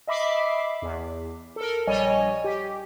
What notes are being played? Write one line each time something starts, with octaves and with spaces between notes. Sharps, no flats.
D#5 E5 B5 D6 C7
E2
A4 A#4
A#1 G3 C#5 D#5 G#5
G4